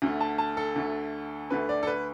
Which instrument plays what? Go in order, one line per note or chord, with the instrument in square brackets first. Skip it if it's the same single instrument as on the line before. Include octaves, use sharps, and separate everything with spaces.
[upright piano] D2 D3 A3
A5
A5
A4
D2 D3 A3
D2 D3 A3 B4
D5
A4
B4